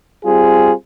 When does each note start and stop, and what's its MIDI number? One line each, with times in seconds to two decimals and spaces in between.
0.24 0.73 55
0.24 0.73 60
0.24 0.73 65
0.24 0.73 68